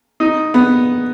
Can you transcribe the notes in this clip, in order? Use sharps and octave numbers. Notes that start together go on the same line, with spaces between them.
D#4
B3